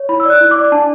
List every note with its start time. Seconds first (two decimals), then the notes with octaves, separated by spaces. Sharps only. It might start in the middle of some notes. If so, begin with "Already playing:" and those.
Already playing: C#5
0.09 E4 B5
0.20 E6
0.25 D5 F#6
0.40 E4 F#6
0.51 D6
0.56 D5
0.72 D4 A5